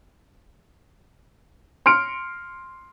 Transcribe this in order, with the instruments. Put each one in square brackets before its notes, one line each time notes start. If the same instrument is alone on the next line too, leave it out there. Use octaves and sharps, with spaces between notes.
[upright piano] C6 F6 C#7 D7